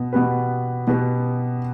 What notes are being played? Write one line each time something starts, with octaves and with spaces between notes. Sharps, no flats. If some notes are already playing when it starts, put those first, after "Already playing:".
Already playing: B2 B3
B2 B3 G4 B4
B2 B3 G4 B4